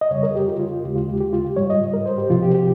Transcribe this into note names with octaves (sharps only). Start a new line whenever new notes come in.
D#5
F2 C#3 G3 C#5
A#4
G#4
G4
F4
F4
F4
D#2 C#3 G#3 G4
F4
G4
G4
F4
G4
G#2 G3 C#5
D#5
A#4
C5
G4
C2 C3 F3 F4
G4
G4